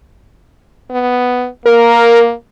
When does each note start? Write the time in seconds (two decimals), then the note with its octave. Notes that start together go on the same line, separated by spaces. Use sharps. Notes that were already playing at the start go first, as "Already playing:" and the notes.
0.91 B3
1.66 A#3 A#4